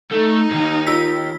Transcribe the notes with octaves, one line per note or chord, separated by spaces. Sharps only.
A3 D#4
D#2 G#2
F4 E6 B6